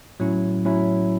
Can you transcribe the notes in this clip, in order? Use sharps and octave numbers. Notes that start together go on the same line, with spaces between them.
A2 F#3 C#4 E4
A2 F#3 C#4 E4